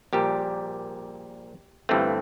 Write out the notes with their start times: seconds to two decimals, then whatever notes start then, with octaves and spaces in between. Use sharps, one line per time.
0.13 A#1 A#2 G3 G4
1.89 G1 G2 E3 A3 C4